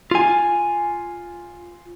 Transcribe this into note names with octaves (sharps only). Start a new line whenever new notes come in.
F4 G#5